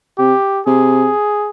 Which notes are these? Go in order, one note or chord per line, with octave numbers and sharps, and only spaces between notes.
C3 G4
C3 G#4